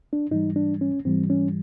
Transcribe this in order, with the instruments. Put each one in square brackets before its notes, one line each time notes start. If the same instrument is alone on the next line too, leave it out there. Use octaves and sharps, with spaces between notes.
[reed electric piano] D4
G#2 E3 G3 D#4
D4
C#4
G#2 E3 G3 C4
C#4